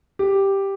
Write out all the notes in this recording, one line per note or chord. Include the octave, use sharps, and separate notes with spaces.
G4